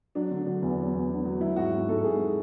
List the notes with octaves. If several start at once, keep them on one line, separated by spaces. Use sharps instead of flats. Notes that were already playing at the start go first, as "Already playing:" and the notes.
F#3 D4
D3
F#3
E2
F#3
E2
D3
F#3
F#3 E4
G#2 F#4
G#2
G#2 A4
G#2 G#4